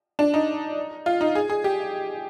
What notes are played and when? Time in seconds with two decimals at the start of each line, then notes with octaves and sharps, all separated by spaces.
0.19 D4
0.34 D#4
1.06 F4
1.21 D#4
1.35 G#4
1.49 G#4
1.64 G4